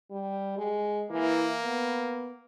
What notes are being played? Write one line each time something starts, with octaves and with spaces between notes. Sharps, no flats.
G3
G#3
E3 A#3
B3